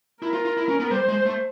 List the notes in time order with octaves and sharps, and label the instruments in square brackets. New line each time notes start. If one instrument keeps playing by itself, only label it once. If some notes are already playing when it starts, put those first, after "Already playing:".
[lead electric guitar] E4 [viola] A#4
[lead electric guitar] F4
F4
E4
C#4
B3
[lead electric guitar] G3 [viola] C5
[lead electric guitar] G#3
A3